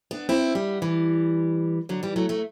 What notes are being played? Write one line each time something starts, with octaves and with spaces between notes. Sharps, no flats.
B3 D4
C4 E4
G3 B3
E3 G3
D3 F#3
E3 G3
F#3 A3
F#3 A3